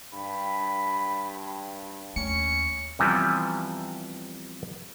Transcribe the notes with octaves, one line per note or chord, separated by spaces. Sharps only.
G2 B5
D#2 A3 C#4 C#7
C3 E3 F3 G3 B3